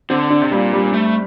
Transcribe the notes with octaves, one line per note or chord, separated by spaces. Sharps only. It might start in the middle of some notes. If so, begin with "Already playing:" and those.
D3 C4
D4
C3
A#2 G3
G3
A3